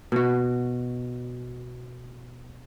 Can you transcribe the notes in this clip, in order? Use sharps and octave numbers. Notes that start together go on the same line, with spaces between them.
B2 F#4